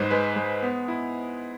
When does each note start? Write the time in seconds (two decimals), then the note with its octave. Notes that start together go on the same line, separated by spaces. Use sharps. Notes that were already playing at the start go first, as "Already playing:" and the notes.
Already playing: G#2 G#3 B4 C5
0.10 G#3 B4
0.36 G#3
0.63 B3
0.88 E4